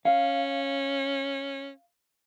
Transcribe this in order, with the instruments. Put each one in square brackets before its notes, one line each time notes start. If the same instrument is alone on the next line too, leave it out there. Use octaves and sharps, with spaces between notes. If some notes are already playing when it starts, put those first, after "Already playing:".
[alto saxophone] C#4 [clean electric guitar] F5